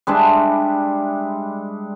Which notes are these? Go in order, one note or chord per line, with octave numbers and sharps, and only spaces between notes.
G3 G#3 D4 E5